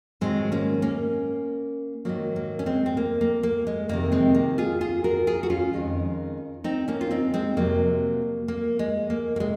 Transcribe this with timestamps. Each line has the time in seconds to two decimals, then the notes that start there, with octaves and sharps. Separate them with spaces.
0.21 G#2 D#3 F#3 G#3 C4
0.52 A#3 C#4
0.82 A#3 C#4
2.05 G#2 D#3 F#3 A#3
2.36 A#3
2.59 C#4
2.66 G#3 C4
2.86 C4
2.97 A#3
3.21 A#3
3.43 A#3
3.67 G#3
3.89 F2 C3 D#3 A#3
4.12 G#3 C4
4.35 A#3
4.58 F4 G#4
4.81 F4 G#4
5.04 F#4 A#4
5.27 F4 G#4
5.43 F#4
5.50 C#4 F4
5.73 F2 D#3 G#3
6.64 C4 D#4
6.88 A#3 C#4
7.01 F4
7.11 C4 D#4
7.34 G#3 C4
7.57 F2 C3 F#3 A#3
8.48 A#3
8.79 G#3
9.10 A#3
9.36 A#3
9.40 C3 G#3